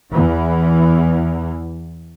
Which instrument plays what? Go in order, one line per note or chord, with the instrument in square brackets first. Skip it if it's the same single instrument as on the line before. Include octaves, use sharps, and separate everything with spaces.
[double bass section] E2 E3